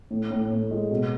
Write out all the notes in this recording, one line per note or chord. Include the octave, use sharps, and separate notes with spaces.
A2
A2
A2
G#3
B2